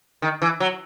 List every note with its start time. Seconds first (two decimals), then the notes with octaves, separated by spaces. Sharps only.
0.22 D#3
0.42 E3
0.60 F#3